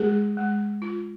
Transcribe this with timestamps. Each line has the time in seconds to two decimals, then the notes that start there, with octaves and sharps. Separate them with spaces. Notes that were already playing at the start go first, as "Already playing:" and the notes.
Already playing: G#3 G#4
0.37 G#3
0.82 F4